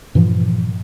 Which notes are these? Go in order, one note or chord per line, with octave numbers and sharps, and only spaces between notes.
G2 A#2 E3 F3